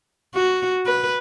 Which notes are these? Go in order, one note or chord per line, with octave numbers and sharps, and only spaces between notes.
F#4
B4